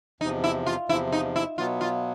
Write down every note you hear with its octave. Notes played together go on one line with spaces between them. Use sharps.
E2 C3 F3 D#4
E4
F4
E2 C3 F3 E4
D#4
E4
B2 F#3 B3 F4
F4